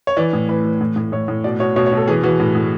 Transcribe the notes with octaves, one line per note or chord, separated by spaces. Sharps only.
C#5
E3 D5
A2
E3 B4
E3
A2
A2
A2 C#5
A2
B2 D5
B2 C#5
B2 C#5
C#5
B2 A4
E3 G#4
E3 F#4
A2
A2